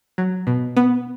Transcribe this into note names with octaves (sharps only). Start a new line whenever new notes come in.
F#3
B2
B3